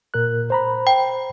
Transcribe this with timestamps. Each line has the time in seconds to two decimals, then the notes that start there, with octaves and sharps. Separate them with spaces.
0.14 A#2 A#4 F#6
0.50 C5 A#5 B5
0.87 G5